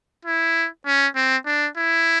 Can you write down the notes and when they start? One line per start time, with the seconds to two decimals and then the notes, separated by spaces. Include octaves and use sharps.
0.25 E4
0.86 C#4
1.16 C4
1.46 D4
1.77 E4